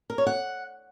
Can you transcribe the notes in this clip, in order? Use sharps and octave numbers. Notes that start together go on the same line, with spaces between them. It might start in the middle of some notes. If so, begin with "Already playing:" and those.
A#4
C#5
F#5